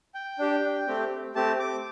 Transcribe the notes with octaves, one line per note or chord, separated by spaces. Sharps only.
G5
D4 G4
A3 C4 G4
A3 C4 G4 A5
D6